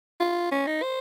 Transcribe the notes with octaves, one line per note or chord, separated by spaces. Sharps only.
F4
C#4
D#4
C5